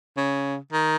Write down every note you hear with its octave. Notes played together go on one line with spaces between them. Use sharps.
C#3
D#3